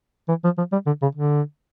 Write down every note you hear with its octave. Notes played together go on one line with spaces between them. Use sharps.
E3
F3
F3
G3
D3
C#3
D3